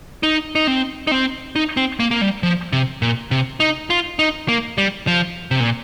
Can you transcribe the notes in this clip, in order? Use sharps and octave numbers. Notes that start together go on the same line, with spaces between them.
D#4
D#4
C4
D#4
C4
D#4
C4
A#3
A#3
G3
F3
C3
A#2
C3
D#4
F4
D#4
A#3
G3
F3
C3
A#2